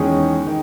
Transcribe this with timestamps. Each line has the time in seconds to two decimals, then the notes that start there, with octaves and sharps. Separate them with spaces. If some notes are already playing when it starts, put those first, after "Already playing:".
Already playing: E2 D#3 G#3 C#4 G#4
0.47 D#3